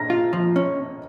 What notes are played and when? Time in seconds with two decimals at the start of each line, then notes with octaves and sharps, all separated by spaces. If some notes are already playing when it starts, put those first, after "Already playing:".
Already playing: A#5 A#6
0.10 F4
0.33 F3
0.56 C#4